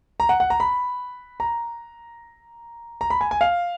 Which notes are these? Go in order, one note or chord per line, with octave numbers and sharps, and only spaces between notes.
A#5
F#5
F#5
A#5
B5
A#5
A#5
B5
G#5
G#5
F5